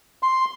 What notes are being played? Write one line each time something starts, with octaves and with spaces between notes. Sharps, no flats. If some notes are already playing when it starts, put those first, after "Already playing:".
C6